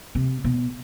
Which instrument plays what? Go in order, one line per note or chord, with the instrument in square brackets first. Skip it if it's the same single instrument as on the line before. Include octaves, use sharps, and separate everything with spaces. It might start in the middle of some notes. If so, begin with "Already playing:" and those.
[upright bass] C3
B2